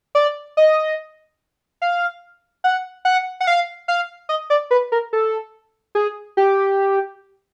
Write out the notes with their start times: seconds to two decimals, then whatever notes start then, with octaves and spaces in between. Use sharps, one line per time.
0.15 D5
0.57 D#5
1.82 F5
2.64 F#5
3.05 F#5
3.40 F#5
3.47 F5
3.88 F5
4.29 D#5
4.50 D5
4.71 B4
4.92 A#4
5.13 A4
5.95 G#4
6.37 G4